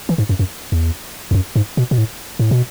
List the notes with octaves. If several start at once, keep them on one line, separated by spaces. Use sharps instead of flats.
E3
G#2
F#2
F#2
E2
E2
F#2
G#2
B2
B2
A2
A2
B2